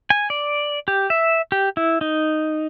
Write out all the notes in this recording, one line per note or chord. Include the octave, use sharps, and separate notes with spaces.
G#5
D5
G4
E5
G4
E4
D#4